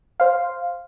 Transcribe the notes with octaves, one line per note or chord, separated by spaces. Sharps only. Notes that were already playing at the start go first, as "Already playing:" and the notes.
C5 F5